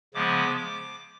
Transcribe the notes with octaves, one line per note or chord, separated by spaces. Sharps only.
C#3 F3 G#3 B3 D6
D6